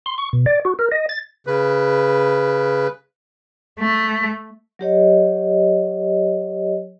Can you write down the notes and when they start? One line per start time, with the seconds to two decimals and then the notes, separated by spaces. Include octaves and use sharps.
0.06 C6
0.18 C#6
0.33 B2
0.46 D5
0.65 F#4
0.79 A#4
0.92 D#5
1.09 A6
1.47 C#3 B4
3.79 A3
4.79 F#3 G4 C#5 D#5